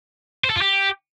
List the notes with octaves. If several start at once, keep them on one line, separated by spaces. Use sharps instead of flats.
C5
A4
F4
G4